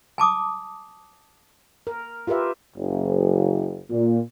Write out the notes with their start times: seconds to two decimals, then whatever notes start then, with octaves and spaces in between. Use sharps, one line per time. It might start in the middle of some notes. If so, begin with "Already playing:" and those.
0.18 G#5 A5 D6 D#6
1.87 A#4
2.27 F4 G4 A#4 B4 E5
2.77 F#1
3.90 A#2